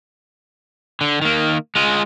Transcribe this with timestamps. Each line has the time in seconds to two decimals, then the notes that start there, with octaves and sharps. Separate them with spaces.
1.01 D3
1.22 D#3 A#3
1.75 G#3 F4